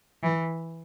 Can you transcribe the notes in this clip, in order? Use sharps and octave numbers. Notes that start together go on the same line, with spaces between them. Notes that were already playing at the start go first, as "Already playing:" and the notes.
E3